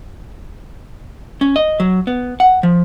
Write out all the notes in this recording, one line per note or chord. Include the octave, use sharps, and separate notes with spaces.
C#4
D#5
F#3
B3
F#5
F3